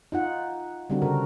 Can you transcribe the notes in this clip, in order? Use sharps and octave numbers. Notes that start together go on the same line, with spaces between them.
D#4 F4 F#5
D3 G3 C4 D4 F#4
C#3 A#4